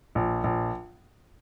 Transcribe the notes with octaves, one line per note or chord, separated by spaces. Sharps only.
A#1
A#1